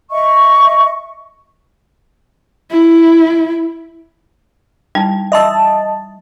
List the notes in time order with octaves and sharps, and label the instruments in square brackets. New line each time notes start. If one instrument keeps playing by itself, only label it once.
[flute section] D#5 E5 C#6
[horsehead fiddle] E4
[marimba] G3 [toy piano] D#4 E4
[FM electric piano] D#5 A5 [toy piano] E5 C6 E6